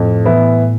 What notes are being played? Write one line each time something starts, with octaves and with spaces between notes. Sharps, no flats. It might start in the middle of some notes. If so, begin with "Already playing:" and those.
Already playing: F2 A2
E3 B3 E4